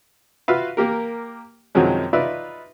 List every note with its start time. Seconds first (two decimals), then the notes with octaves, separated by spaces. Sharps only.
0.48 F4 F#4 B4 E5 F5
0.77 A#3 G4 A#4
1.75 F#2 C3 D#3 F3 F#3 G#3
2.13 D#4 F4 B4 D5 E5